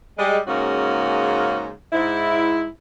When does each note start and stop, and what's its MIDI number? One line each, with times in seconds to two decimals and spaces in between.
0.19 0.38 55
0.19 0.38 56
0.47 1.70 44
0.47 1.70 49
0.47 1.70 58
0.47 1.70 61
0.47 1.70 66
1.92 2.66 44
1.92 2.66 64